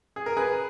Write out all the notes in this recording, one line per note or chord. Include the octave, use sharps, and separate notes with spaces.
G#4
A#4
G#4 B4